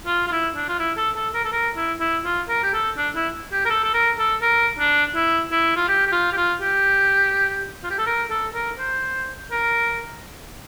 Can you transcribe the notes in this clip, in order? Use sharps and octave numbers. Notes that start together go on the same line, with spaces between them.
F4
F4
E4
D4
F4
E4
A4
A4
A#4
A4
A#4
E4
E4
F4
A#4
G4
A4
D4
E4
G4
A#4
A4
A4
A#4
A4
A#4
D4
E4
E4
F4
G4
G4
F4
G4
F4
G4
F4
G4
A4
A#4
A4
A#4
C5
A#4